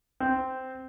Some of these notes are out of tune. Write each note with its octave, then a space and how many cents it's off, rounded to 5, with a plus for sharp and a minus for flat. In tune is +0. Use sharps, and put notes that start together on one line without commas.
C4 -10